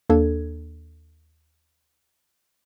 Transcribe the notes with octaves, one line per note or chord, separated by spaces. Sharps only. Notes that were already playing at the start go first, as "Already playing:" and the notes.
D#2 A#3 D4 A4 G#6